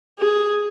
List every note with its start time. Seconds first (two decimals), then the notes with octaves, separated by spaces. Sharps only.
0.19 G#4